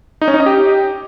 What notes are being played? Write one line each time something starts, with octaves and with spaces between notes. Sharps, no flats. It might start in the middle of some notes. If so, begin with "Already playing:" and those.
D#4
C#4
D#4
D#5
G4